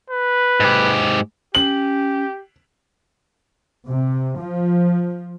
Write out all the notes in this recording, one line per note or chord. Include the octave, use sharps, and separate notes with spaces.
B4
G#2 G4
C#4 G4 F#7
C3
F3